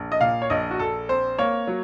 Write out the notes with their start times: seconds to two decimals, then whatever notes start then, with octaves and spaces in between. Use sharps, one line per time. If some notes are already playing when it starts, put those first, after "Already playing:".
Already playing: A#1
0.12 D#5
0.21 A#2 F5
0.42 C#5
0.50 A#1 D#5
0.71 F#4
0.79 A#1 A4
1.09 C4 C5
1.38 A#3 C#5
1.67 F#3